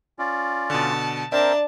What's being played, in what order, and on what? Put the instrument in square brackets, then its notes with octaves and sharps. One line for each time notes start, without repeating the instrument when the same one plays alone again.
[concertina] C#4 F4 D5
[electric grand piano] B2 D3 [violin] A5
[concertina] C4 A#4 C5 [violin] D4 A5 [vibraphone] D5 [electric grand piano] E5 A#5